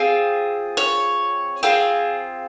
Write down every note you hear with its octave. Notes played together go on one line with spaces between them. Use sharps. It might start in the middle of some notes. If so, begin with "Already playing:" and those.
Already playing: C4 F4 G#4
C#5
C4 F4 G#4